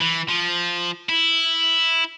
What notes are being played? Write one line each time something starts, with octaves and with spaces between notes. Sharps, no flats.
E3
F3
E4